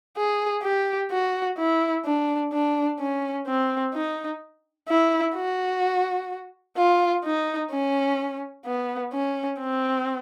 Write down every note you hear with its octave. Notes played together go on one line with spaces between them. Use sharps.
G#4
G4
F#4
E4
D4
D4
C#4
C4
D#4
E4
F#4
F4
D#4
C#4
B3
C#4
C4